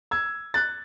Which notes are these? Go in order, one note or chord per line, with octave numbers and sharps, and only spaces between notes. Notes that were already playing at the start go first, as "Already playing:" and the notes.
E6 G#6
F#6 A6